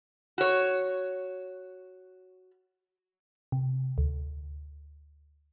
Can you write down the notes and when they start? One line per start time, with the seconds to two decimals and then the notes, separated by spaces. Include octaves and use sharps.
0.38 F#4 C#5
3.52 C3
3.98 D2